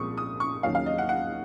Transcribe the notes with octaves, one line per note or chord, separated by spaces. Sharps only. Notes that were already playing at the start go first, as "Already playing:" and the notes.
Already playing: C2 A#2 F3 G#3 C4 C#6 D#6
D#6
C#6
D#2 C#3 F#3 A#3 F5
F5
D#5
F#5
F#5